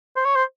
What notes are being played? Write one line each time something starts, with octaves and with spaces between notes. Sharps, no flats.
C5
C#5
C5